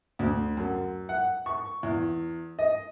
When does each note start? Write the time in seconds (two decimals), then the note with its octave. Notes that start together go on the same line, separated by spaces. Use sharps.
0.19 D2
0.57 F#2
1.09 F#5
1.46 C#6
1.83 E2
2.59 D#5